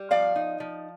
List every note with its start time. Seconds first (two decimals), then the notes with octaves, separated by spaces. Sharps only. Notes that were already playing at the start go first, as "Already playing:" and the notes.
Already playing: G3
0.11 F3 D5 F5
0.36 D#4
0.60 F3